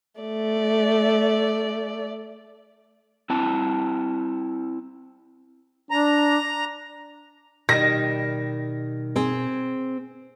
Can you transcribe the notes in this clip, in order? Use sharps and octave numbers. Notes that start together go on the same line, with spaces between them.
A3 D5
C4 E4 A5
D4 A#5
B2 D#3 G3 A#6
C4 G#4 G#5